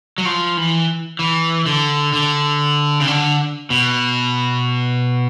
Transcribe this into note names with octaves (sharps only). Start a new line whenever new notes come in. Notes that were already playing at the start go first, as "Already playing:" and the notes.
F#3
F3
E3
E3
D3
D3
C#3
D3
B2